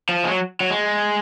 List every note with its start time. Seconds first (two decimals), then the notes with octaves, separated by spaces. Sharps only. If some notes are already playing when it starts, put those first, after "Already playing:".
0.09 F3
0.24 G#3
0.30 F#3
0.60 F#3
0.70 G#3